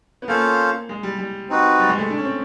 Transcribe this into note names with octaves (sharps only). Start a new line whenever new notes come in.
B3
A#3 C#4 F4 A4 C5 F5
G#3
G3
G3
C4 D#4 F#4 B4
G3
G#3
A3
D4
C#4
C4